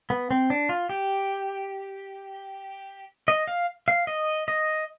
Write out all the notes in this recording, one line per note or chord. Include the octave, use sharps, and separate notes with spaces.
B3
C4
D4
F4
G4
D#5
F5
F5
D#5
D#5